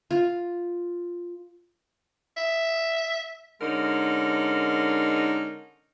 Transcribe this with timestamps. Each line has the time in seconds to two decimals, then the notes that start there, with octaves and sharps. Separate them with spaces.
0.11 F4
2.37 E5
3.61 D3 G#3 C#4 D#4 A#4